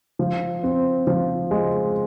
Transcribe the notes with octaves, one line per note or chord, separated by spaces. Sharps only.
F3
C4
F3
G#3